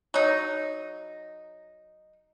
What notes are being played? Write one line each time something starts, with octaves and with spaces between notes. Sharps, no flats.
F#3 D#4